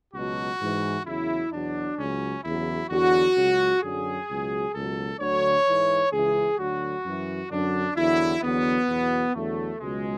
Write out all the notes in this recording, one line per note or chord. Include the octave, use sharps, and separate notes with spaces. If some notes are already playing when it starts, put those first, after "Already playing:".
C#2 B2 F#3 F#4
G#2 E3
E2 C#3 F#3 E4
E2 B2 F#3 D4
C#2 C#3 F#3 C#4
E2 C#3 F#3 E4
E2 D3 F#3 F#4
C#2 C#3 F#3
F#2 D3 F#3 G#4
C#2 B2 F#3
C#2 B2 F#3 A4
D2 D3 F#3 C#5
G#2 E3
C#2 C#3 E3 G#4
D2 D3 F#3 F#4
F#2 E3
F#2 D3 F#3 D4
E2 D3 F#3 E4
E2 D3 F#3 B3
E2 B2 F#3
E2 D3 F#3 A3
C#2 B2 F#3 G#3